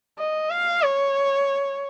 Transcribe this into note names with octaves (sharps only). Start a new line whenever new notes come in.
D#5
F5
C#5